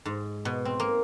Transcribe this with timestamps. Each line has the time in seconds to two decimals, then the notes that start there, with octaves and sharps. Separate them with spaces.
0.05 G#2
0.45 B2
0.65 C4
0.80 A#3